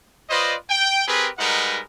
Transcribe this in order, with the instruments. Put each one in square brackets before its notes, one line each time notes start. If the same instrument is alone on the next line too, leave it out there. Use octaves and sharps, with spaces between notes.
[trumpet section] F4 B4 C5 D5 D#5
G5
C4 G4 G#4 A#4 B4
G3 G#3 D#4 A#4 B4 F#5